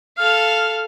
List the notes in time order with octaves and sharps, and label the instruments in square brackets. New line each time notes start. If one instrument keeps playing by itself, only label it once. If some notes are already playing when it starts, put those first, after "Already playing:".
[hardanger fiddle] A4 F5 [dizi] F6